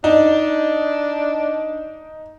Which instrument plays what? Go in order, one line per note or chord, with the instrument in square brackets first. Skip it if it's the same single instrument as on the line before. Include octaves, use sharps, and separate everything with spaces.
[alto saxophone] D4 [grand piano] D#4